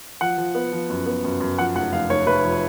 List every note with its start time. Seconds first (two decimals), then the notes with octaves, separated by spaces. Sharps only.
0.21 F3 F#5
0.38 F3
0.55 B3
0.73 F3
0.90 F#2
1.06 B3
1.24 F#2
1.40 F#2
1.58 F3 F#5
1.75 F1 F#5
1.92 F1 F5
2.10 F1 C#5
2.26 F1 B4
2.44 F3